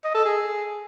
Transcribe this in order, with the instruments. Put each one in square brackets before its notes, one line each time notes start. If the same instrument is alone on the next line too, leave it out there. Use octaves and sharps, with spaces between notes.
[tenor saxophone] D#5
A4
G#4